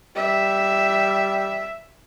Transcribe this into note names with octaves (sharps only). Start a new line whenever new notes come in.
G3 E5